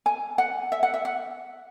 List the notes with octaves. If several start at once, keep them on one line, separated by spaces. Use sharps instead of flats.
G#5
F#5
E5
F#5
E5
F#5